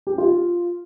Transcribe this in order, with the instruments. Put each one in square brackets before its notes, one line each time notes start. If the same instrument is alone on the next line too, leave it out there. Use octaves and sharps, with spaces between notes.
[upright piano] G4
F4